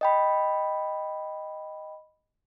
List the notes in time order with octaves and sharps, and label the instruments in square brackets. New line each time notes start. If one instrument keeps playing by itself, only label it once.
[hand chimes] D#5 G5 B5